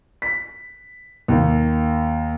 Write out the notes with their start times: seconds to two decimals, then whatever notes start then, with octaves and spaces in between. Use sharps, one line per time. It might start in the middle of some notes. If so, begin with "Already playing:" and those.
0.22 B6
1.28 D#2